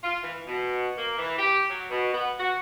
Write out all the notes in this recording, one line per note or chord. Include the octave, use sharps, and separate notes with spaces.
F4
E3
B2
A#3
E3
G4
F#3
B2
B3
F#4